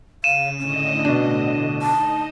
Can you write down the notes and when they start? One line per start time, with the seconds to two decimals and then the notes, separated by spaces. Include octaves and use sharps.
0.24 C#3 F5 D#7 E7
0.59 A2 D3 C#4 D#5
1.05 B2 D4
1.82 D#4 D#5 A5